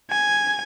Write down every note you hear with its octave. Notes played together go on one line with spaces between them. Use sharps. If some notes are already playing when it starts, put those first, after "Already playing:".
G#5